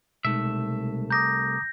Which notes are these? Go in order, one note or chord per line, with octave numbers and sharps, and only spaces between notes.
C2 B2 G#3 A3 D#4 E5
A#5 D6 D#6 G6 A#6